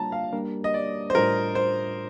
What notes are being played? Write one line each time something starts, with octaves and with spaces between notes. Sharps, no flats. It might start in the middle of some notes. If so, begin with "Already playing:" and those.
Already playing: G3 A#3 D4 F4 A5 A#5
F5
G3 A#3 D4 G4 A#4
D#5
D5
C5
A2 G3 D4 F4 A#4
C5